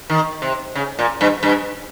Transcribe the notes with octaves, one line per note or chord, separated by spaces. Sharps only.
D#3
C3
C#3
A#2
G2
G2